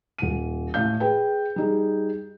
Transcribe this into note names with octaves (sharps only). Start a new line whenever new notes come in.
D#1 D#7
A2 F5 G6
G#4 B4 G5
G3 D#4 G#4